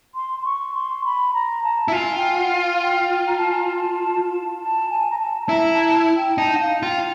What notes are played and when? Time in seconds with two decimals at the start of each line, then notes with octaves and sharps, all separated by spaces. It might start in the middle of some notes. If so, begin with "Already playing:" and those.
0.15 C6
0.40 C6
0.45 C#6
0.74 C6
1.05 B5
1.34 A#5
1.64 A5
1.88 E4
1.92 F4 G#5
2.16 G5
2.38 F#5
2.60 F5
2.82 G5
3.27 A#5
3.38 A5
3.50 G#5
3.61 A5
4.60 A5
4.90 G#5
5.10 A#5
5.19 A5
5.42 A5
5.49 E4 A#5
5.72 A5
6.16 G5
6.37 D#4 A5
6.54 F#5
6.60 F5
6.82 F4 G5